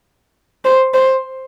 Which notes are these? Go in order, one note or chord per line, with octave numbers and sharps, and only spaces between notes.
C5
C5